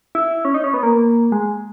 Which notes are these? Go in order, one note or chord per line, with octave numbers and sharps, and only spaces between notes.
E4
C#4
D#4
C#4
B3
A#3
G#3